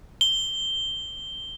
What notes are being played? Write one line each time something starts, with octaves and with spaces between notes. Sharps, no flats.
G7